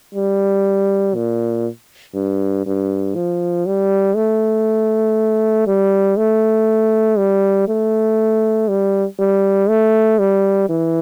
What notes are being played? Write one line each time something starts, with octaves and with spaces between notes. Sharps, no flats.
G3
A#2
G2
G2
F3
G3
A3
G3
A3
G3
A3
G3
G3
A3
G3
E3